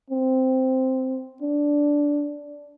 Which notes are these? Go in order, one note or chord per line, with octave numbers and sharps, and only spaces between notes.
C4
D4